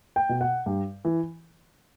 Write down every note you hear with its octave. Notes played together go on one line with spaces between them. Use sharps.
G5
B2
F#5
G2
E3